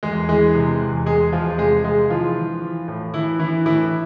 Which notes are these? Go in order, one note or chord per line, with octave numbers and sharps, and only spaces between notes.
E2 G#3 G#4
E3 G#3 G#4
C3
E2
E2 G#3 G#4
E2 F3 F4
C3 G#3 G#4
C3 G#3 G#4
E3 F3 F4
E3
E3
A2
E3 E4
E3 E4
A2 E3 E4